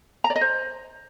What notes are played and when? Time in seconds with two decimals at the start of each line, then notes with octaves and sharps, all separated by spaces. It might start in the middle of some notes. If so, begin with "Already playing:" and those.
0.24 A#5
0.30 D5
0.36 D#5
0.41 C5